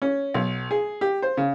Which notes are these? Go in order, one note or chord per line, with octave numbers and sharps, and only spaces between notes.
C#4
B1
G#4
G4
C5
C#3